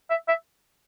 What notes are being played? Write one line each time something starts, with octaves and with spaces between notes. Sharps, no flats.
E5
E5